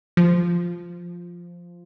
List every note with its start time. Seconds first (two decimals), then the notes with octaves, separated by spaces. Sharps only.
0.17 F3